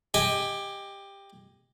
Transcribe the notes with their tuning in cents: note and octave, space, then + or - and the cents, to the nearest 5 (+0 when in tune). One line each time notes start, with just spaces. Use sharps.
G4 +15 D#5 +0 G#5 +0